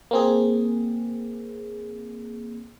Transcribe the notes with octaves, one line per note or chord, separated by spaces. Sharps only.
A#3 C4 G#4